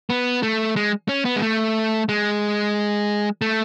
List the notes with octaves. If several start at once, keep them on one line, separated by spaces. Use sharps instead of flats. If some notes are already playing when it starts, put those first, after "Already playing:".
B3
A3
G#3
C#4
B3
G#3
A3
G#3
A3